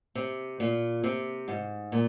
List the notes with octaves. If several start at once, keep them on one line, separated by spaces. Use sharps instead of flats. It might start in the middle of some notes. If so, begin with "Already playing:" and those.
C3
A#2
C3
G#2
A#2